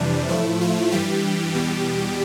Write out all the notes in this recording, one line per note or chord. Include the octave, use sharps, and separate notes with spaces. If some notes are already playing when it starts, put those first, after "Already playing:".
Already playing: F2 C3 E3 G3 D4
A2 F3 A3 E4
F4
G2 E3 G3 G4
E2 B2 G3